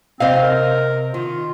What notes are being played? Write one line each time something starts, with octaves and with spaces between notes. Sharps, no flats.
C3 C4 C5 D#5 F5
A#4
D#3 F4